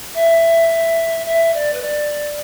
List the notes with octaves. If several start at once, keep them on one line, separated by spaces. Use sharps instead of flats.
E5
E5
D5
B4
D5